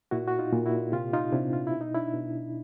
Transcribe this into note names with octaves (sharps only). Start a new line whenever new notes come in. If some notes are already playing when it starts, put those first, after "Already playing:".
A#2 E4 F#4
F#4
D#4 F4
A#2
E4 F#4
C3 F4 G4
D#4 F4
C3 D4 E4
F4
E4
B2
D#4
D4 E4
B2